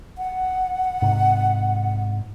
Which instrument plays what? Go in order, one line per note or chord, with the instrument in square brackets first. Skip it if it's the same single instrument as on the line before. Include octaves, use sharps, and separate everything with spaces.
[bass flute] F#5
[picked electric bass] G#2 C3